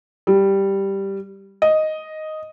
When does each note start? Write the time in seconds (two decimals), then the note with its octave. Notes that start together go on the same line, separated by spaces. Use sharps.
0.27 G3
1.62 D#5